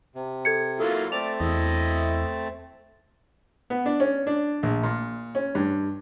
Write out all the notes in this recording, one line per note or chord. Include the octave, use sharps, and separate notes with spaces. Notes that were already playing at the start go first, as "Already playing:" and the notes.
C3
A4 G#6 C#7
F#3 A#3 E4 F4 A4
A3 C4 D5 A5 F7
E2 E4 D#5
B3
D4
C#4
D4
A#1
A#2
C#4
G2